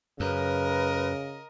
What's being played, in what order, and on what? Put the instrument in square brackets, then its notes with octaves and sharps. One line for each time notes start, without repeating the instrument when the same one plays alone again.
[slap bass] F#2 [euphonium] C#3 [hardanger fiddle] A#4 D#5 [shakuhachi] B4